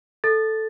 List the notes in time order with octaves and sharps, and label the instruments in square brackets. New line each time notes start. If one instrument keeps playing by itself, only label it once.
[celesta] A4 A6